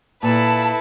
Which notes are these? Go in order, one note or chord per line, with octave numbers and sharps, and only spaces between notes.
A#2 E4 A4 B4 A5